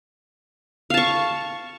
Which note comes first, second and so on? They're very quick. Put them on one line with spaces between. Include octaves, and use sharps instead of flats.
F5 A5 C#6